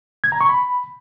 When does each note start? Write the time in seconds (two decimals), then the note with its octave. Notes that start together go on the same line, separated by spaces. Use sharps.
0.24 G#6
0.32 A#5
0.41 C#6
0.49 B5